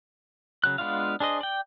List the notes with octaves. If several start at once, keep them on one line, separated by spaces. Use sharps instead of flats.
C#3 F#3 F#6
G#3 B3 D4 F4 F5
D4 G#4 C5 D#5
D5 G5